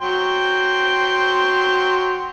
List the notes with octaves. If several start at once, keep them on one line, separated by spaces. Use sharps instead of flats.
F#3 G5 C6